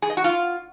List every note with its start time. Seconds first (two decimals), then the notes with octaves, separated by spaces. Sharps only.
0.02 G#4
0.10 D#5
0.17 F#4
0.24 F4